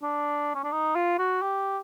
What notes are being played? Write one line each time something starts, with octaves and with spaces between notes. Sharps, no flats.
D4
C#4
D4
D#4
F4
F#4
G4